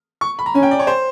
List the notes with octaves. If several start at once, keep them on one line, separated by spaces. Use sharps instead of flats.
C#6
B5
A#5
C#4 G#5
G5
D5
C#5
C5